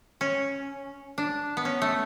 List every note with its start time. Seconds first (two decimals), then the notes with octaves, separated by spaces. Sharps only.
0.21 C#4
1.18 D4
1.57 B3
1.65 C#4
1.82 A3